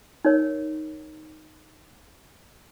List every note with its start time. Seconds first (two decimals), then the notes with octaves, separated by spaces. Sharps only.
0.25 D#4 A#4 C#5